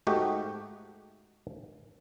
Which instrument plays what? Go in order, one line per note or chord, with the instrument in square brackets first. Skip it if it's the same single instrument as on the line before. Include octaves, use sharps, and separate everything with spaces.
[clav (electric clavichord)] G#2 A3 D#4 F#4 G4